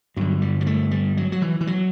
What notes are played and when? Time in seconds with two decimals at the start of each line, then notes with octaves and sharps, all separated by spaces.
0.17 G2 D3 F#3
0.42 G3
0.61 G3
0.66 A3
0.91 G3
1.17 F#3
1.32 F#3
1.42 E3
1.61 E3
1.67 F#3